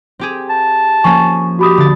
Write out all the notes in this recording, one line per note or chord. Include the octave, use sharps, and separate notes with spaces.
C4 G4 G#4
A5
F3 A#3 C#4 G#5 C#6
F#4 G4 B5 D#6
D3 A6